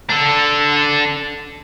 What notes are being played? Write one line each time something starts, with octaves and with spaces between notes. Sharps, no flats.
D4 A4